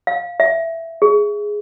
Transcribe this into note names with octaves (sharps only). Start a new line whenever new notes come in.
F5
E5
G#4